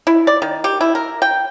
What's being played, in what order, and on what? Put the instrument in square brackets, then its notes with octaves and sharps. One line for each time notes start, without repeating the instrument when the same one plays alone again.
[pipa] E4
D5
D#3
G4
E4
A#4
G5